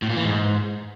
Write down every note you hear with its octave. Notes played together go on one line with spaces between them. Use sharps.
A2
A#2
E3
G#2